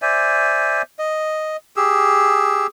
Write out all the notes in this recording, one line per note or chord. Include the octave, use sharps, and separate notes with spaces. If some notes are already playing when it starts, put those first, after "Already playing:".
C5 D5 E5 G#5
D#5
G4 G#4 E6